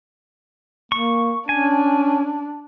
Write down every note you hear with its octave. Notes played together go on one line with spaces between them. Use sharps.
A#3 C#6
C#4 D4 G#5